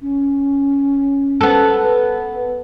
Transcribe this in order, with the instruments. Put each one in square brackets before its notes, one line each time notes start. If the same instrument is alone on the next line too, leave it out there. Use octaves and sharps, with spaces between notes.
[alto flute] C#4
[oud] B3 A4
[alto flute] B4